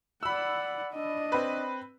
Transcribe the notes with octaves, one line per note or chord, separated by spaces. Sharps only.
D5 F#5 B5 E6
D4 D#5
C4 B4